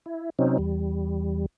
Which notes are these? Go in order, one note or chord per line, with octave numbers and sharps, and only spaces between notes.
E4
C3 F#3 C4 C#4 D#4
E2 G3